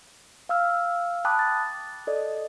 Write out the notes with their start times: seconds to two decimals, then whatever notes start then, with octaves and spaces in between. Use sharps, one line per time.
0.49 F5 E6 F6
1.25 G5 A5 B5 D6 D#6 F#6
1.39 A6
2.07 A4 D5 D#5